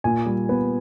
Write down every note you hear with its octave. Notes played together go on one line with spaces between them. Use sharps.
A#2 G#5
G3
B3